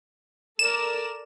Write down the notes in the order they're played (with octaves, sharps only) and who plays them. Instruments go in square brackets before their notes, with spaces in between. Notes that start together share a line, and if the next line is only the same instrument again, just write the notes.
[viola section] A4 A#4 D5 [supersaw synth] E7